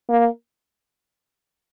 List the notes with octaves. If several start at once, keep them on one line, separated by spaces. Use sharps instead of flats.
A#3